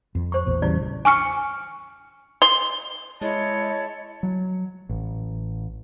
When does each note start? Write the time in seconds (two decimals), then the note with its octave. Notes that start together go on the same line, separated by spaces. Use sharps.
0.15 F2 F3
0.32 C5 C#6
0.46 A1 E2 A#2
0.62 C#3 E3 G3 D5
1.05 G#5 C#6 F6 C#7
2.42 C6
3.21 G#3 E4 C#5 D#5 A5
4.23 F#3
4.89 A1